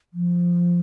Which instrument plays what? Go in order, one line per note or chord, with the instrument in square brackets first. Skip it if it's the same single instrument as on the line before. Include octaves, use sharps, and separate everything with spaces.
[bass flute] F3